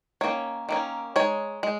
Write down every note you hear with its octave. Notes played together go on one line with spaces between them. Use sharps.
D#3 A#3 C#4 C#5
D#3 A#3 C#4
G#3 D#4 C#5
G#3